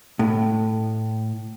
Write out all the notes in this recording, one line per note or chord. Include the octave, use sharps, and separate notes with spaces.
A2